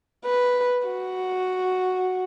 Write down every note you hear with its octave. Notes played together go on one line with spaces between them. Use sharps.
B4
F#4